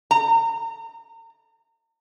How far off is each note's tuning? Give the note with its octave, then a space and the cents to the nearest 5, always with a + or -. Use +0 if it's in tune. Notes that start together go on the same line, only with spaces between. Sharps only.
A#5 -40